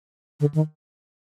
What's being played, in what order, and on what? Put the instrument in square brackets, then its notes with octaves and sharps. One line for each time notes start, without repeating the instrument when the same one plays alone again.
[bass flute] D3
D#3